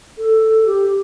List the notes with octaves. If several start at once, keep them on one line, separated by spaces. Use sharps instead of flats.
A4
G4